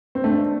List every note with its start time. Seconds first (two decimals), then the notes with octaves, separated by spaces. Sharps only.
0.15 C4
0.24 A3 D4